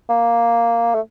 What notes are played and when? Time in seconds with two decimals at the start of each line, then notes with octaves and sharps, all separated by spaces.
0.09 A#3
0.94 A3